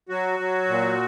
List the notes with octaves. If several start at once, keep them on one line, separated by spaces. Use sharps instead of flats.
F#3 F#4
F#3
A#2